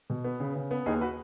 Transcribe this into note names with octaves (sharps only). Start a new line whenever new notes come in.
B2
B3
C#3
C#3
B3
D#2 D#4 G#4
F#4 B4